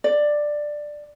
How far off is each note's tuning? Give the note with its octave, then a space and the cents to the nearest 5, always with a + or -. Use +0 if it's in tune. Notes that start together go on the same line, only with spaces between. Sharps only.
D5 +10